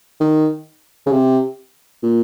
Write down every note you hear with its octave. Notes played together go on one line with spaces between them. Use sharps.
D#3
C#3
C3
A#2